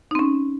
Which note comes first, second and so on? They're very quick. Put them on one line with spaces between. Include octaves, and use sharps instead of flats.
D#4 C4 C#4